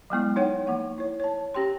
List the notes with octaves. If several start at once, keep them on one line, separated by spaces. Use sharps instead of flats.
F#3 G#3 B3 E4
F3 D#4 C#5 F#5 G5
F3 A#3 F#5 C#6
E4 C#5
C#5 A5
C#4 G4 G5 C6